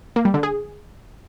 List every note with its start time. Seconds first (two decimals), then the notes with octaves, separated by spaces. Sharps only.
0.16 A#3
0.25 G3
0.34 D3
0.43 G#4